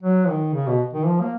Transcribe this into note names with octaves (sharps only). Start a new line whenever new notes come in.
F#3
D#3
C#3
B2
D#3
F3
A#3